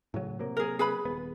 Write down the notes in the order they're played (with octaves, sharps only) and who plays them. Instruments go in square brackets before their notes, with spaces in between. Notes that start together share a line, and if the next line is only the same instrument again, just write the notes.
[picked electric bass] A2 C#3 F#3
C3 F#3 A#3
[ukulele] G#4 A#4
G#4 B4 B5
[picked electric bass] D#1 B3